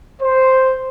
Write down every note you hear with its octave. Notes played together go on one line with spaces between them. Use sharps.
C5